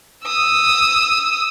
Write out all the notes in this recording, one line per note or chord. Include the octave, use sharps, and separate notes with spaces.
D#6 E6